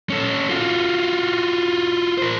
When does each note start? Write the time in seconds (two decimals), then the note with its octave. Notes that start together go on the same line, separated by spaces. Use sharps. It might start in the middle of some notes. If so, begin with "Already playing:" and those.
0.10 C#4 A4
0.49 F4 F#4
2.18 A#4 C5